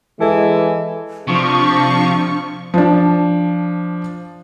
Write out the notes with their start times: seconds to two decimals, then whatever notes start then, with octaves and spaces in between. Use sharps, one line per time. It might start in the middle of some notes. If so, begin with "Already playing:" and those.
0.20 E3 G#3 G#4 A4
1.27 C3 F3 D4 C#6
2.74 F3 D4